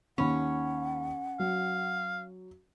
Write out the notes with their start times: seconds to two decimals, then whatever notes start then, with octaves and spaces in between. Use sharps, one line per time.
0.18 D#2 C#4 F#5 B5 C#6
1.40 F#3 F5